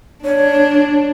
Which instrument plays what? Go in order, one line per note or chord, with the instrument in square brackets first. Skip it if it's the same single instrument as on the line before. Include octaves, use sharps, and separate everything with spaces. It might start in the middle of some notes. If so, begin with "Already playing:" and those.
[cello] D4 [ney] C#5